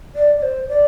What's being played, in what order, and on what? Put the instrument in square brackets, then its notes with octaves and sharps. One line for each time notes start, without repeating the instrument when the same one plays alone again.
[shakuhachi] D5
D5
C5
D5